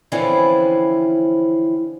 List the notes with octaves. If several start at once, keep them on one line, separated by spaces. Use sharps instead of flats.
D3 E3 F3 C4 C#4 E4